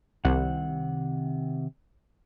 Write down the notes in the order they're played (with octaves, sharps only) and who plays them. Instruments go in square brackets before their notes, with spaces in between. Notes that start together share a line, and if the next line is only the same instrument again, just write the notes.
[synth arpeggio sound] C2 [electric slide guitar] C3 D#3 F#5